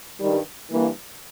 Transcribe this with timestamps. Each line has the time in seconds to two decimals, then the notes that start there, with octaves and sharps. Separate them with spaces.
0.20 G2 D#3 G3
0.71 G2 E3 A#3